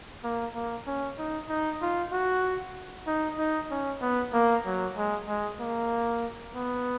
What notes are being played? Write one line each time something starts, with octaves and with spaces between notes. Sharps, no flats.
A#3
A#3
C#4
D#4
D#4
F4
F#4
D#4
D#4
C#4
B3
A#3
F#3
G#3
G#3
A#3
B3